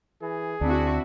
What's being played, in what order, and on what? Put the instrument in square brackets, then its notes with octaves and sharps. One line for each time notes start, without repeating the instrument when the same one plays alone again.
[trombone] E3 [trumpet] G#4
[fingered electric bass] D2 [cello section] C4 E4 F#4 [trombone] D4